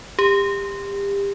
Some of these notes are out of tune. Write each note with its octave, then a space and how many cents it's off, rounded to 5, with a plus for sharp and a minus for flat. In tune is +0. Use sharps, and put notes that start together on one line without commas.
G4 +30